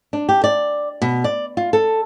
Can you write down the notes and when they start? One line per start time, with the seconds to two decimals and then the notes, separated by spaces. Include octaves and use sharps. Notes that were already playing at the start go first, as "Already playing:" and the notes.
0.13 D4
0.29 G4
0.44 D5
1.02 B2
1.24 D5
1.57 F4
1.73 A4